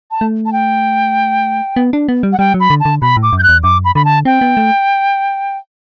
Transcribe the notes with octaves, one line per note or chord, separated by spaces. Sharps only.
A5
A3
A5
G5
B3
D4
B3
G3
F#5
G3 G5
F#3
B5
D3
A5
D3
B2 B5
A2
D6
F#2
G6
F#6
E2
F#2 D6
B5
D3 B5
A5
C4 G5
B3
A3